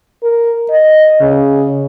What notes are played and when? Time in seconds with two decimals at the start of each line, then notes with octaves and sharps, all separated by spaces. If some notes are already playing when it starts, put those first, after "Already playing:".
0.23 A#4
0.70 D#5
1.20 C#3